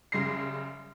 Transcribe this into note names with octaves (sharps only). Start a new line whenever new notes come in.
F#2 C#3 G3 C6 A#6 C7